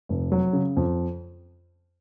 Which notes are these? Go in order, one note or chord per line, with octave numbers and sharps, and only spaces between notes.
F1
F#3
C#3
F2